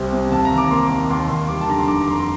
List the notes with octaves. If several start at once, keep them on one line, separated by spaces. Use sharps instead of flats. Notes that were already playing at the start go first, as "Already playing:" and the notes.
Already playing: C2 G3 C4 C5
C3
D#2 A5
A#5
D#2
D6
A#3 C6
D#3
D#2 C6
D#2 C6
G3 D6
A5
D3 A#5
C6
F1 D6
A#5
F1 C6
C6